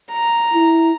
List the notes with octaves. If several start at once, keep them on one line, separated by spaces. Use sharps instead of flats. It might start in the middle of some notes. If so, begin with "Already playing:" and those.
A#5
E4